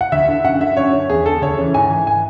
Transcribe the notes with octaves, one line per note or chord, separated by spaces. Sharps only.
F#5
D2 E5
D3
F#2 F#5
D3 E5
F#2 C#5
D3
E2 G#4
D3 A4
D2 C#5
C#3 E3
G#2 G#5
E3
G#5